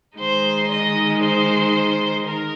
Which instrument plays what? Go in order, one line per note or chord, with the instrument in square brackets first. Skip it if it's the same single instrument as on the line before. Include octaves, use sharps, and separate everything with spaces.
[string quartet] D#3 G#3 D#4 C5
D#5
C5
D#3 A#4